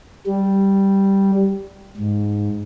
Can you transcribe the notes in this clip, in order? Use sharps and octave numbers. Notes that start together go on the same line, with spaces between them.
G3
G#2